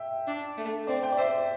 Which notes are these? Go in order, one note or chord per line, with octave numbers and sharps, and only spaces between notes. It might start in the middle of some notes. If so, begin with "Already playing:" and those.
Already playing: E5 G5
D4
A3
C4 D5
G5
D5
C5 E5